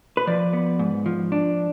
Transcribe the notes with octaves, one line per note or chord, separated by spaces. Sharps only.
B4
F3 D5
B3
G#2
F3
D4